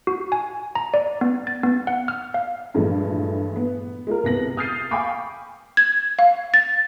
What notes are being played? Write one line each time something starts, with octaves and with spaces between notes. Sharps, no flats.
F#4
G#5
A#5
D5
B3
A6
B3
F#5
F6
F5
G2 A#2 E3 F3 G#3 A3
B3
G#3 F4 A#4
C2 B3 A#6 F#7
D#6 F6 G6 A6 C7 D#7
F5 G5 G#5 B5 C#6 D6
G#6
F5
A6